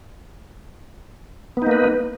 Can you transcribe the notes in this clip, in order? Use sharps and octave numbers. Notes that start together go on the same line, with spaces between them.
A#3 B3 D#4 B4